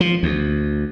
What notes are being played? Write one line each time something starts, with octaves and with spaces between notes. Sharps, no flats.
F3
D2